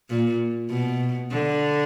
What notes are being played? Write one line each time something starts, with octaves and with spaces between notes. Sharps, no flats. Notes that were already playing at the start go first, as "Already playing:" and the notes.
A#2
B2
D3